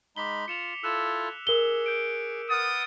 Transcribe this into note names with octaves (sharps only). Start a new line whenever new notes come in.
G#3 D#4 B5 D6 B6 G7
F4 C#7 E7 F7
E4 F4 A4 E6 F#6 E7
G#4 A#4 G7
G6 D7
B4 F#5 D#6 F6 A6